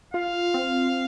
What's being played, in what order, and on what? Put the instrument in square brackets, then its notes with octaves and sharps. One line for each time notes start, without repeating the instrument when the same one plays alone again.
[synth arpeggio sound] F4 [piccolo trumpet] F5
[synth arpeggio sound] C4